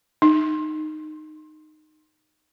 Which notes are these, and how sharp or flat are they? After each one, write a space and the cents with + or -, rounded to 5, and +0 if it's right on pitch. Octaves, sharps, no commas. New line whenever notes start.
D#4 -15